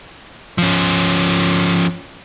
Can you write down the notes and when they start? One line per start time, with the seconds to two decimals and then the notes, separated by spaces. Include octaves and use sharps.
0.58 F3 C#4